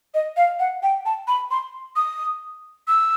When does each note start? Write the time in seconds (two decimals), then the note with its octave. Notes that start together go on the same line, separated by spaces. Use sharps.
0.14 D#5
0.37 F5
0.60 F#5
0.83 G5
1.06 A5
1.28 B5
1.51 C6
1.96 D#6
2.88 E6